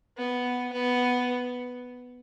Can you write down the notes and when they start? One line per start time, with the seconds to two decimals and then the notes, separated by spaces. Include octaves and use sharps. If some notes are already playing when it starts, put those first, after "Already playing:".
0.17 B3
0.73 B3